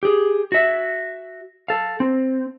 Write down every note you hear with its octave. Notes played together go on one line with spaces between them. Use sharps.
G4 G#4
F#4 E5
A4 F5
C4